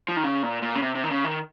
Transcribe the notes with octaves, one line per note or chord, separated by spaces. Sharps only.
F3
D#3
C#3
A#2
A#2
C#3
C3
C3
D#3
C#3
D#3